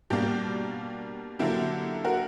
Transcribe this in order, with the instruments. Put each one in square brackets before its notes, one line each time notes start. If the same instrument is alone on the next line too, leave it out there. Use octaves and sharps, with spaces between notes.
[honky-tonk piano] B2 G3 A#3 D4 G4
D3 F#3 A#3 E4 G4
F#4 A#4